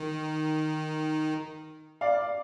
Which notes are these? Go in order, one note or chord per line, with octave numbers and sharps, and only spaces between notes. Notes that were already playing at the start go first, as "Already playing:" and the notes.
Already playing: D#3
D5 F5